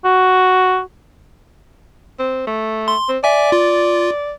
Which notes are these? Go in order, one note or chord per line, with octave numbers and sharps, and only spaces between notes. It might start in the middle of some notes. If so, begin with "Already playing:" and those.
F#4
C4
A3
C6
C4
D5 E5 G#5
F4